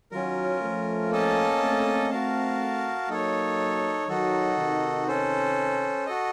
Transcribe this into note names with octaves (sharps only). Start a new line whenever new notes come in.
D#3 F#3 C#4 F4 A#4
F3 A3
A#3 C#4 A4 D#5 A5
A3 C4
F#4 A#4 F5 A5
F#3 A#3 D#4 A4 C#5
D#3 F#3 D#4 F#4 A4
C3 D#3
C#4 A4 C5
F#4 A4 D#5